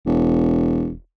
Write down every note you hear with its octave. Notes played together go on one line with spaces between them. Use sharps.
E1